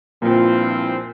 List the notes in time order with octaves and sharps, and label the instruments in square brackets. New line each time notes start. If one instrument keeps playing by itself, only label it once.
[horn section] G2 F3 C4 E4 [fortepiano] A#2